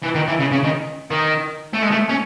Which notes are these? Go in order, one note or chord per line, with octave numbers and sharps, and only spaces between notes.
E3
D#3
E3
C#3
C#3
D#3
D#3
A3
G#3
A3
C#4